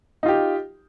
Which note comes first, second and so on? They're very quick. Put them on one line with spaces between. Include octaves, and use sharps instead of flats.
D#4 F4 G4